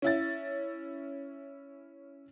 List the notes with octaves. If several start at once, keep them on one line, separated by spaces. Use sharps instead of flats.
C#4 E4 A6